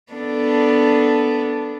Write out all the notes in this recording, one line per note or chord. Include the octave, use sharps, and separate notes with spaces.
B3 D4 A4